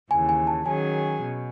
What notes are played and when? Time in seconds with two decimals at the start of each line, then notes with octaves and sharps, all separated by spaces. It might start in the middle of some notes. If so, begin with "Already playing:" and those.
0.11 D#2 C#3 E3 G#5
0.29 G#5
0.47 A5
0.66 D#3 F#3 C#4 G#4 G#5
1.21 B2